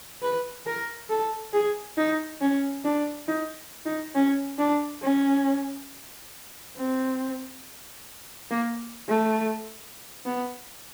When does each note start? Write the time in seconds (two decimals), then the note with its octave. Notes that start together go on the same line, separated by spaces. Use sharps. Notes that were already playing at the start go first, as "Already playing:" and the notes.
0.22 B4
0.67 A#4
1.10 A4
1.53 G#4
1.97 D#4
2.41 C#4
2.84 D4
3.28 D#4
3.86 D#4
4.15 C#4
4.58 D4
5.02 C#4
6.77 C4
8.51 A#3
9.09 A3
10.26 B3